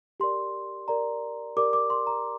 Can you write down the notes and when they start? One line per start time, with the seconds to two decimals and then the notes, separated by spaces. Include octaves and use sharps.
0.20 G4 A#4 D5 C6
0.88 G4 A#4 D5 A#5
1.57 G4 A#4 D5 D6
1.73 D6
1.90 C6
2.07 A#5